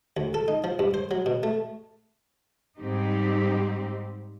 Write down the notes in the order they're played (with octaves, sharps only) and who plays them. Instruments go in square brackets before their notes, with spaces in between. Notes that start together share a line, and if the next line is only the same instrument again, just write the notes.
[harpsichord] D2
A4
D#4
F3
G2
C5
F#3
B2
A3
[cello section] G#2 G3 C4 D#4 G4